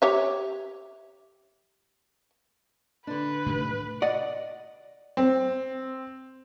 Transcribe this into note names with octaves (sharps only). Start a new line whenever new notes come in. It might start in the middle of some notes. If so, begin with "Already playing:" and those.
G4 C#5 E5
D3 D4 B4
A2 C3 D#3
D5 D#5 F#5
C4